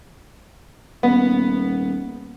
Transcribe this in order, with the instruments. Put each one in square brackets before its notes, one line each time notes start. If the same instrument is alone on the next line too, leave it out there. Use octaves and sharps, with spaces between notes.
[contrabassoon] D#1 [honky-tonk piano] B3